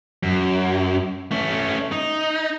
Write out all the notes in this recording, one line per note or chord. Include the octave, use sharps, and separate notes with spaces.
F#2
A3 C#4
D#4